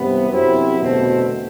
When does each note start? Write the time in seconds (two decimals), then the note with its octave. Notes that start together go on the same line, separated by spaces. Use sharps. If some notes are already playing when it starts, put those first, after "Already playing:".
Already playing: G2 C3 E3 B3
0.31 F#2 C3 F#3 C4 E4
0.79 E2 B2 D3 A3 C4